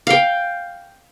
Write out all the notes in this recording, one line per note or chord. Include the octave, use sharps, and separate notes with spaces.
F5 G5